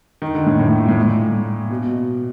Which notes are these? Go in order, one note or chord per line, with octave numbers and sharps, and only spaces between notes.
D#3
D3
A2
A2
A#2
A2
A#2
B2